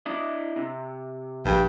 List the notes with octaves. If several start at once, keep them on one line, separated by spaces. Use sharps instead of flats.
D4 E4 D#5
C3
A#1 G2 G#4 G5